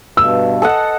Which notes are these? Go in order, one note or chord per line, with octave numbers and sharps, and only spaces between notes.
G2 B2 E6
A4 D#5 F#5